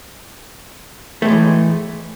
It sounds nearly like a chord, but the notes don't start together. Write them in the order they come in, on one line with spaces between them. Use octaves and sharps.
A3 G#3 A2 E3